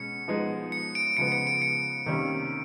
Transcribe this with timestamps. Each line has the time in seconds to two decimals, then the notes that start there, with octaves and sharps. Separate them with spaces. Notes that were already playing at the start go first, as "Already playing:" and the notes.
Already playing: B2 G#3 C#4 C#7
0.28 F3 G#3 B3 D#4
0.72 C#7
0.95 D7
1.17 C#3 F3 G#3 B3 C#7
1.32 C#7
1.47 D7
1.62 C#7
2.06 C3 D#3 G3 A#3 C#4